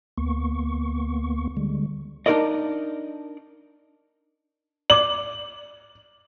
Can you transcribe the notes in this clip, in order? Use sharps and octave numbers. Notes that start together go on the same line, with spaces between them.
D2 A#3 B3 C#6
D3 G3 G#3
D4 D#4 G4 A#4 D5 D#5
D5 D6 F#7